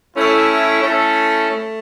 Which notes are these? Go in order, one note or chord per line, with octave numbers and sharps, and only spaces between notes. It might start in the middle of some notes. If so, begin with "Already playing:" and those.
A3 C#4 E4 A4 C#5
A3 C#4 E4 A4
A3